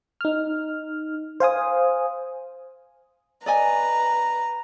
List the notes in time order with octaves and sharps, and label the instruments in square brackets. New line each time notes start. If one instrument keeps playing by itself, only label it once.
[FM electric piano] D#4 F6
C5 F5 G#5 D#6
[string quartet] B4 A#5 [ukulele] D5 D#5 G#5